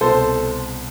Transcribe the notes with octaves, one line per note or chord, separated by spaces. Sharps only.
C2 B2 A4 C5